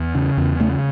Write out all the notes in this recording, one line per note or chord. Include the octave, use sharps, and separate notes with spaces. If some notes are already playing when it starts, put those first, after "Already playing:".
Already playing: E2
C#3
E2
C#3 A3